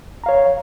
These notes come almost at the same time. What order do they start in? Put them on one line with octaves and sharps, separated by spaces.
A#5 F5 C#5